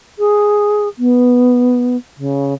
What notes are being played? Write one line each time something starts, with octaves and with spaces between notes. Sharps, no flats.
G#4
B3
C#3